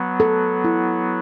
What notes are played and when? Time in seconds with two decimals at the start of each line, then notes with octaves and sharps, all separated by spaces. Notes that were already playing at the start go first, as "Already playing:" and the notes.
Already playing: F#3 B3
0.20 A4
0.64 E4